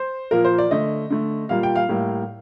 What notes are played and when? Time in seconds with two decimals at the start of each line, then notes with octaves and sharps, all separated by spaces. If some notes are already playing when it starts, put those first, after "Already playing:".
Already playing: C5
0.31 A#2 F3 A#3 A#4
0.45 C5
0.58 D5
0.71 D3 A3 D#5
1.10 D3 A3
1.49 A#2 G3 A#3 F5
1.63 G5
1.76 F5
1.89 A2 G3 A#3